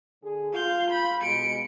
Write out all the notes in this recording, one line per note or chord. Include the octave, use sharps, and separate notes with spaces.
D3 G#4
F4 F5 G6
B5
B2 G#3 C#7 D7